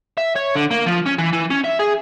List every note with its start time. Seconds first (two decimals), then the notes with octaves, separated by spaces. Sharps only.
0.17 E5
0.36 C#5
0.55 D3
0.71 A#3
0.86 F3
1.06 C#4
1.18 E3
1.33 E3
1.50 C#4
1.64 E5
1.79 G#4